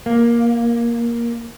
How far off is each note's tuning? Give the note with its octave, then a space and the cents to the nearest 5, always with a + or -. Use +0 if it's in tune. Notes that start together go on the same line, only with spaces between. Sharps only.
A#3 +10